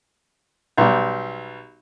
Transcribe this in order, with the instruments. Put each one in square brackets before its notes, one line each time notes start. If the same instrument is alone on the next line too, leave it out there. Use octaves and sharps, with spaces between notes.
[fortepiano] B1 G3